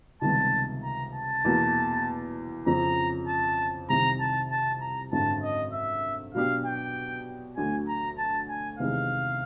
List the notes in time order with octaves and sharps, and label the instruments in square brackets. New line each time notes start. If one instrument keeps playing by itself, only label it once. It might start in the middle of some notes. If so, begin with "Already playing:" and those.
[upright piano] C#2 C3 D#3 G3 B3 [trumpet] A5
[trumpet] A#5
A5
[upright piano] E2 B2 F#3 A#3
[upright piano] F2 C#3 F3 [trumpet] A#5
[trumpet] A5
[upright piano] C2 C3 D#3 [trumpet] A#5
[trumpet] A5
A5
A#5
[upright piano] G#1 F#2 D3 [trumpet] A5
[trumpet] D#5
E5
[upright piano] B2 F#3 B3 D4 G4 [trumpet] F5
[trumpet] G5
[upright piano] D2 D3 F#3 [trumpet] G#5
[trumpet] A#5
A5
G#5
[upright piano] E2 C3 D#3 G#3 B3 [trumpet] F5